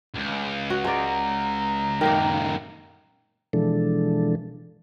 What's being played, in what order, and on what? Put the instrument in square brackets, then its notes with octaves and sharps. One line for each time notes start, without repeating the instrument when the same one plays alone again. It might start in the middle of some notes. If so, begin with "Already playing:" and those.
[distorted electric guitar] C#2
[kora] F#4
[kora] G#3 D5 [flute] A#5
[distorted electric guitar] C#2 F#2 [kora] D#3 A#3
[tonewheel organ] B2 E3 F3 G#3 D4 A4